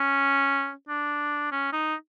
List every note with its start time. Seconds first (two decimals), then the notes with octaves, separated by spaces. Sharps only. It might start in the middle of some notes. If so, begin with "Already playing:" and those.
Already playing: C#4
0.89 D4
1.52 C#4
1.73 D#4